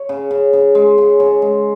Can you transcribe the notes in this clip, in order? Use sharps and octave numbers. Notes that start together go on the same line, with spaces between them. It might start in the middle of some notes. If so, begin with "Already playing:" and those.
Already playing: C#5
C#3
C#3
C#3
G#3
C#3
C#3 C#5
G#3